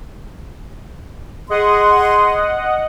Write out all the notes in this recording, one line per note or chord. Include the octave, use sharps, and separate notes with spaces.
G#4 D#5 F#5 C6